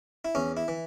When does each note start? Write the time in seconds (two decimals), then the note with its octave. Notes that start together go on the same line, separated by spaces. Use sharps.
0.25 E4
0.35 E2 C#4
0.57 E4
0.68 E3